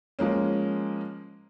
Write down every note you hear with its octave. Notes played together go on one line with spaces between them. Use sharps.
F3 G#3 A#3 C#4